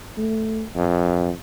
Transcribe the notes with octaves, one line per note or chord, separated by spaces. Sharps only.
A3
F2